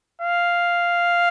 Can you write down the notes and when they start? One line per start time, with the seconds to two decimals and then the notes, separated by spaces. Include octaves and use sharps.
0.22 F5